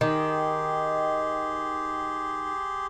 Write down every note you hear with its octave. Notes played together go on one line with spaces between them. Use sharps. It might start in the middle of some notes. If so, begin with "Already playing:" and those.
D#3 G4 G#4 C6